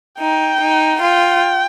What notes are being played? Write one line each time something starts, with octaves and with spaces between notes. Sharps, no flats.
D#4 G5
D#4
F4 G5